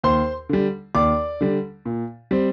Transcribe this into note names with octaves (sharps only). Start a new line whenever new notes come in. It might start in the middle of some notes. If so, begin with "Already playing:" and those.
D#2 C5 C6
D3 G3
D#2 D5 D6
D3 G3
A#2
G3 C4